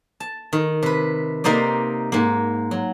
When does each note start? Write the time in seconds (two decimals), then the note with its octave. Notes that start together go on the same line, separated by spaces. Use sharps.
0.20 A5
0.53 D#3
0.83 C3 B4
1.44 C3 A#3 D#4 C5 D5
2.12 G#2 A#3
2.71 F#3